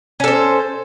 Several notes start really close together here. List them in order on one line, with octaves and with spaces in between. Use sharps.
C#4 A4 C5